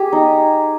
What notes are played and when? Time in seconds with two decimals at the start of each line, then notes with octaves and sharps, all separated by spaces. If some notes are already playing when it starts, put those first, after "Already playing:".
Already playing: G4 G#4
0.12 D#4